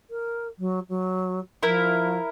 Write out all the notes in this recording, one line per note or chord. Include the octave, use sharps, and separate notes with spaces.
A#4
F#3
F#3
F3 E4 A#4